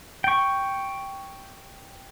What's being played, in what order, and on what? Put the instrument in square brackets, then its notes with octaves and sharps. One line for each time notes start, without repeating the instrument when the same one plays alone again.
[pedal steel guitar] G5 C#6